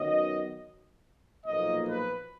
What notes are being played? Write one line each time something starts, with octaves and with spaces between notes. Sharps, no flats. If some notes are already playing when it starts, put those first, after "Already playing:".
Already playing: F#2 D#3 F#3 B3 D#5
B1 A#2 F3 A#3 D#5
B4